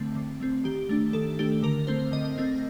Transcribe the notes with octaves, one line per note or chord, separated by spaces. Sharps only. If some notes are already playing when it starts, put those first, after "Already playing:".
Already playing: D3 A3 C4
D3
A3 C4
D#3 G4
A3 D4
D#3 A4
A3 D4 G4
D3 A#4
A3 C4 C5
D3 D#5
A3 C4